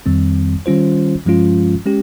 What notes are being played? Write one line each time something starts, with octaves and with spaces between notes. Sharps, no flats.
F2 D#3 G3 C4
D#3 G3 C#4 F4 C5
G2 F3 G#3 C#4 F4
G#3 C#4 G4